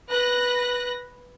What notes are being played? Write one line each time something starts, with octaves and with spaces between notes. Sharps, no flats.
B4 F#6 A#6